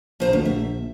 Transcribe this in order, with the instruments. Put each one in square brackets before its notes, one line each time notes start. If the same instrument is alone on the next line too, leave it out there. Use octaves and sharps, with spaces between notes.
[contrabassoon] A#1 [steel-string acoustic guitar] F3 C5 A#5
[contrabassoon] D2 [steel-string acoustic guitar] B2
[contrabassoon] A#1 [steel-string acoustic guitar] E5